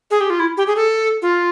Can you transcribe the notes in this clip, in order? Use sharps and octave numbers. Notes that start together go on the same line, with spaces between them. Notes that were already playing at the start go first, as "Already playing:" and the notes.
G#4
G4
F4
E4
G4
G#4
A4
F4